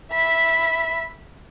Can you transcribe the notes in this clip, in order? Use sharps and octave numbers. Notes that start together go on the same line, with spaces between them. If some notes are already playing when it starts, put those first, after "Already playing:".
E5 B5